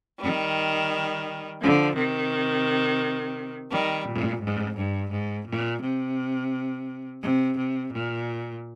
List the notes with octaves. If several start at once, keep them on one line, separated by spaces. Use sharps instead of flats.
D#3 G3
D3 F3
C3 D#3
D#3 G3
A#2
G#2
G2
G#2
A#2
C3
C3
C3
A#2